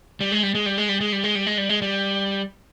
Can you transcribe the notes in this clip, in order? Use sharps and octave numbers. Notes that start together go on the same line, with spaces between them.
G3
G#3
G3
G#3
G3
G#3
G3
G#3
G3
G#3
G3
G#3
G3
G#3
G3